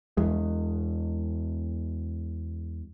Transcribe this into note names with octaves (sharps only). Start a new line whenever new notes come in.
E2 G#3